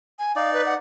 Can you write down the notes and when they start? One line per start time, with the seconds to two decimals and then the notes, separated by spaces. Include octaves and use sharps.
0.19 G#5
0.36 D#4 D5 F5
0.53 B4
0.66 F#5